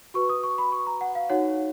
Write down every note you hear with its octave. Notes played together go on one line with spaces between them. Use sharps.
F#4 B4 C#6
D#6
C#6
B5
C#6
A#5
F#5
F5
D#4 F#4 C#5 F#5